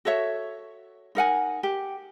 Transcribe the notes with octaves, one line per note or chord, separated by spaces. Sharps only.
F#4 A4 C#5 E5
D#4 A#4 F#5 G#5
G4